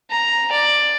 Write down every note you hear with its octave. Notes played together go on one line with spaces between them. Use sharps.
A#5
D5